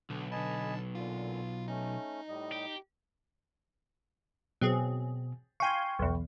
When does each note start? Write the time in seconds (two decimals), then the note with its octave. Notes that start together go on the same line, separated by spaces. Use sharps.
0.10 B1 D3
0.32 D3 D#5 G#5 A5 B5
0.95 A#2 D3 F4
1.68 A3 C#4 D#4
2.28 A2 G3 D#5
2.52 G4
4.61 B2 F#3 C4 G#4
5.60 F5 G5 G#5 C6 C#6
5.99 B1 E2